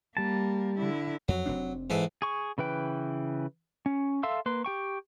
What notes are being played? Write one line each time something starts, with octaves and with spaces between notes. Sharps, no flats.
G3 A#3 A5
D3 E4
F2 F#3
F1 C4 D4
G#2 E3 A4
G#4 C#6
C#3 E3 B4 G5
C#4
A4 E5 F5 C6 E6
A#3 B4 C6
G4 G5 C#6